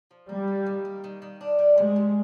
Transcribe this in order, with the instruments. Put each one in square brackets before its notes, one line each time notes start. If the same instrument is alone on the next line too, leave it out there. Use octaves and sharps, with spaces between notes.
[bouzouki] F3
[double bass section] G3 [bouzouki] A#3
[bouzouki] A#3
D#3
A#3
D#3
D#3
D4
G3
[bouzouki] C3 [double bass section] G#3
[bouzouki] C3